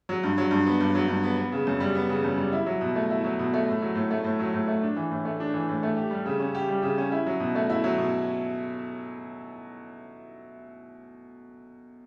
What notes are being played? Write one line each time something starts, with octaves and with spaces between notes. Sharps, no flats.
F#3
G2
F#3
G2
B3
G2
F#3
G2
B3
B3
C#3
F#2
G3
B3
C#3
F#2
G3
E4
F#3
B2
A3
E4
F#3
B2
A3
A2
F#3
A2
A3
A2
F#3
A2
A3
D4
E3
A2
A3
D4
E3
A2
A3
G4
G3
C#3
C#4
G4
G3
C#3
C#4
E4
F#3
B2
A3
E4
F#3
B2